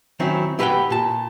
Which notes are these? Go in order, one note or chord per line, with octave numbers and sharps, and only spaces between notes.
D#3 F#3 C4 C#4 E4
E4 G4 B4 D#5 F#5 G5
A#2 A5